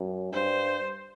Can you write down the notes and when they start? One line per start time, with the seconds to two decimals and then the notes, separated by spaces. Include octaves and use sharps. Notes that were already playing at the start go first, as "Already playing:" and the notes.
Already playing: F#2
0.32 G2 C5